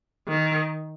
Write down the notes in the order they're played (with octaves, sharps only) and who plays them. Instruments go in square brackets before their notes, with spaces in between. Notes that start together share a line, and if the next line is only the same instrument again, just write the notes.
[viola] D#3